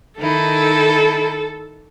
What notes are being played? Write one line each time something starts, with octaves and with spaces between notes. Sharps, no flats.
D#3 D#4 E4 A4